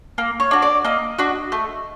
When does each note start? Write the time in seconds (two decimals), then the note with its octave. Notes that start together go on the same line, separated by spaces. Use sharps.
0.18 A#3
0.40 C#5
0.51 D4 F#4
0.62 D5
0.84 A#3 D#5
1.19 D4 F#4
1.52 A3